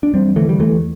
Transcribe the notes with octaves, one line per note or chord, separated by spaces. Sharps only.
D4
E2 G3 C4
D3 E3 A3
G3
E2 E3 A3